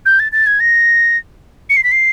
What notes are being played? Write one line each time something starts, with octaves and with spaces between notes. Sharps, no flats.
G6
A6
A6
G#6
A#6
C#7
C7
B6
C7